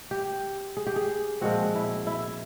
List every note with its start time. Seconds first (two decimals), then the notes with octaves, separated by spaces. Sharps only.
0.11 G4
0.77 G#4
0.87 G4
0.96 G#4
1.41 A#2 F3 G#3 C4 F#4
1.75 E4
2.07 E4